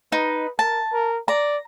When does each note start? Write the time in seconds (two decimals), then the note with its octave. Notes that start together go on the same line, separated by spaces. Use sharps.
0.12 D#4 B4
0.59 A#4 A5
0.92 A#4
1.28 D5 A#5